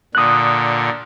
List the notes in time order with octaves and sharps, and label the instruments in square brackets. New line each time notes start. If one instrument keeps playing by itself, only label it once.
[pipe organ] A#2 D3 [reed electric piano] D#6 F#6